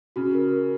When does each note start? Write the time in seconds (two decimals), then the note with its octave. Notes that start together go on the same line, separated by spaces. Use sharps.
0.16 C#3 F#4
0.35 A#4
0.52 A#4